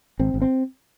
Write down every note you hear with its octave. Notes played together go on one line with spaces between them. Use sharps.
G#1 C4
G#1
C4